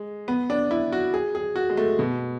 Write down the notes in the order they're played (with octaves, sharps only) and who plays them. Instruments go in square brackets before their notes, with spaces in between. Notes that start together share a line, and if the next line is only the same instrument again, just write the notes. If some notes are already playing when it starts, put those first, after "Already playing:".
Already playing: [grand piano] G#3
B3
D4
E4
F#4
G#4
G#4
F#4
G#3
A3
B2